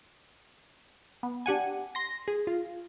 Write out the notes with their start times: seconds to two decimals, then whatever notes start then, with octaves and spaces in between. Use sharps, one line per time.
1.23 B3
1.46 D4 G4 F#5 G#5
1.95 C6 A#6
2.28 G#4
2.47 F4